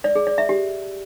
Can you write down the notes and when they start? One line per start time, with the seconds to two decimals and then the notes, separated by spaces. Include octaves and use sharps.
0.04 D5
0.15 G#4
0.27 D5
0.38 E5
0.49 G4